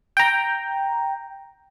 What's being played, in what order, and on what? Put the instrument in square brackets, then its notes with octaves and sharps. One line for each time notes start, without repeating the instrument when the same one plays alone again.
[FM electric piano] G5 A#5